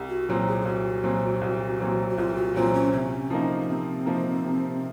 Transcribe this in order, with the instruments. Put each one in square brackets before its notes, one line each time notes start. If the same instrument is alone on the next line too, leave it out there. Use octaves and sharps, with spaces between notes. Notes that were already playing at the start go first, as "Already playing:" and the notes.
Already playing: [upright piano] C2
[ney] F#4
[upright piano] A#2 F#3 C4 [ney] F4
[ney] G#4
G#4
[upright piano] C2 [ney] F#4
[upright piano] A#2 F#3 C4
C2
A#2 F#3 C4
[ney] F#4
[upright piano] C2 [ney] F4
[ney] F#4
[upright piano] A#2 F#3 C4 [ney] F4
[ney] C#4
[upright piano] C3 [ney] C#4
[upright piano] F3 A#3 D#4
[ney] A#3
[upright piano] C3 [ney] C4
[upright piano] F3 A#3 D#4
C3